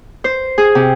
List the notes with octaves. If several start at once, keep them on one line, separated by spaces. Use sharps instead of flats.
C5
G#4
C3